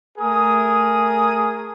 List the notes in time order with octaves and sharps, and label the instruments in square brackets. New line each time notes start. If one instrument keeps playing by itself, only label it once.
[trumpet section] A3 G#4 A#4 D#6